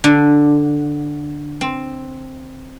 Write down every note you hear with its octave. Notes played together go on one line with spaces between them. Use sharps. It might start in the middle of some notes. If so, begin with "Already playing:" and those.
D3
C4